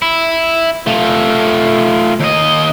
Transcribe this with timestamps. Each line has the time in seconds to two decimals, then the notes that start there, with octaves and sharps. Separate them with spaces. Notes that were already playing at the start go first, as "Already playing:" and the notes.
0.02 E4
0.87 A3 F4
2.20 D#2 D#5